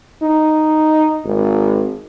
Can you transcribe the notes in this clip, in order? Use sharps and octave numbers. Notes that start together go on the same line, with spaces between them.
D#4
G#1